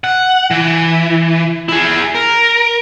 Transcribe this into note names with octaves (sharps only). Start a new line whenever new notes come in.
F#5
E3
E4 G#4
A#4